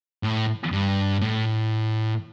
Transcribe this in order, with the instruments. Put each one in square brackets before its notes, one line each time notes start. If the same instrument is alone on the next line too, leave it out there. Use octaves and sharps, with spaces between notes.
[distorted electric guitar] A2
G2
A2